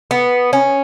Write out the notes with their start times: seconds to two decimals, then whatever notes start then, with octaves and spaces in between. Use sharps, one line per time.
0.11 B3
0.53 C#4